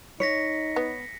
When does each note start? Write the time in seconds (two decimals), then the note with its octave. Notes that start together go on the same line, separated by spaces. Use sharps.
0.20 D#4 C#5 A#6 B6 C#7
0.76 B3